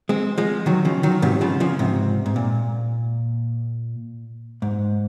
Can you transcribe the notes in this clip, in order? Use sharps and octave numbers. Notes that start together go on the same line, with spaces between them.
G#3 C4
F3 G#3
D#3 F#3
C#3 F3
D#3 F#3
G#2 C3
C#3 F3
C#3 F3
G#2 C3
G#2
A#2
G#2